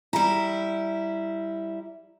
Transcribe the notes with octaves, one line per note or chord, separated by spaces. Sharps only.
G3 E4 A#5